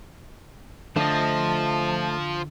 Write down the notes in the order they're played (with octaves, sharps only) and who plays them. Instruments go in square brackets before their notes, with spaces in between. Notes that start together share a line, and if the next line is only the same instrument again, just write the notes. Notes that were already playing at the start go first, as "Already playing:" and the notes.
[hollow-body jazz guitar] D3 [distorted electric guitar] F3 [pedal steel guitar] A3 D#5 [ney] A5